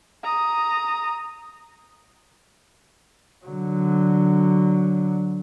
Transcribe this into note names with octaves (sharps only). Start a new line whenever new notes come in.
A#5 D#6
D3 F#3